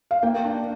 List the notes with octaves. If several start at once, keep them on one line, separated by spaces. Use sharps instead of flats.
F5
A#3 G5
D4